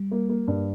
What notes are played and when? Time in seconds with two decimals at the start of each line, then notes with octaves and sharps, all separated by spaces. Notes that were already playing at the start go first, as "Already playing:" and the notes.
Already playing: G3
0.11 A#3
0.29 A#3
0.47 G2